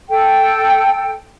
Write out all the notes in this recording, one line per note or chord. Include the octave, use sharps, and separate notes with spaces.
A4 G5